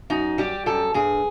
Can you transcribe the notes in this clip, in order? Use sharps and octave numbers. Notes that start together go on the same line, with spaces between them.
F#2 D#4
G3 G4
F#2 A4
G2 G#4